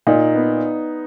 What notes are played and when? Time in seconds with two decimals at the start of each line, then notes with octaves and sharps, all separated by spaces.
0.07 A#2 D#4
0.35 B3